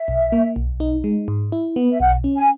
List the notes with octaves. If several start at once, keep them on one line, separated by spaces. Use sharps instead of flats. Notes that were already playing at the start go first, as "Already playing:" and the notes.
Already playing: E5
B1
A#3
B1
D#4
G#3
G#2
E4
B3
E5
B1 F#5
C#4
G#5